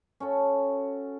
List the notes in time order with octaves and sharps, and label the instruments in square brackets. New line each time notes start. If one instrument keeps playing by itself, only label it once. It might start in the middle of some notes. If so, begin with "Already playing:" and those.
[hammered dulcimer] C#4 F#4 A4